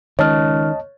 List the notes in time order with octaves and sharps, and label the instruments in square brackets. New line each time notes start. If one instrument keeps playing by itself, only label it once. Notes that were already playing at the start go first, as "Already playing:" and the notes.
[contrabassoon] C#2 [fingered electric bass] D#3 [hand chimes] C#5 F6 [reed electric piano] D#5 A5